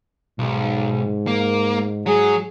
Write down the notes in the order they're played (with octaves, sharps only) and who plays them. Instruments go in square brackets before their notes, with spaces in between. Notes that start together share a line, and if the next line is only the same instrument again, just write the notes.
[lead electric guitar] B1 [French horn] G#2
[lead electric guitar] A#3
[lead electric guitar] F#3 [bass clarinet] G#4